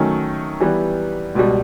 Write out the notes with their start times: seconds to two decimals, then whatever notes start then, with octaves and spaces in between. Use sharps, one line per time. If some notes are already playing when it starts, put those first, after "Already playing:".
Already playing: D#3 F#3 A3 C#4
0.60 E3 G3 B3
1.35 C#2 B2 G3